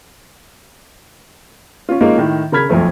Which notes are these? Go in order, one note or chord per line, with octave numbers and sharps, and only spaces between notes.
C#4 F4
G#3 A#3 C#4 D#4 F4 A#4
A2 D#3
C#3 A#4 B5 F6 G#6 B6
B1 F2 F3 A3